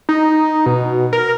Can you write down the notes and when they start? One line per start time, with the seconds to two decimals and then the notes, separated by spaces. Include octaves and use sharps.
0.09 D#4
0.66 B2
1.13 A#4